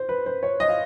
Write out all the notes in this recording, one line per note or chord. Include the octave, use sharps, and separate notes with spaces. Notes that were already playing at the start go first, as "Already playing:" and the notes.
Already playing: C5
B4
C5
C#5
D#5
F5